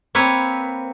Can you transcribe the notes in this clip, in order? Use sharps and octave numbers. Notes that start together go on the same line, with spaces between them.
A#3 C4 B4 C#5